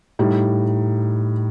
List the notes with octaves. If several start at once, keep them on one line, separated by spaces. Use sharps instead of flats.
A2 G3 D#4